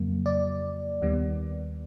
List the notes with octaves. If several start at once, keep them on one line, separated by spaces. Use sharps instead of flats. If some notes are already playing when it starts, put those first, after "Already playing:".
Already playing: F2 C#3 F#3 A#3
D5
D#2 D#3 G3 B3